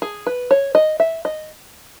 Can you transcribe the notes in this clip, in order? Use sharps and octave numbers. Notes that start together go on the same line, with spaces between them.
G#4
B4
C#5
D#5
E5
D#5